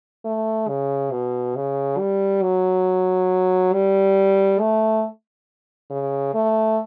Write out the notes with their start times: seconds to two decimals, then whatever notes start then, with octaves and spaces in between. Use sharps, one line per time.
0.25 A3
0.68 C#3
1.11 B2
1.56 C#3
1.99 G3
2.43 F#3
3.73 G3
4.60 A3
5.91 C#3
6.34 A3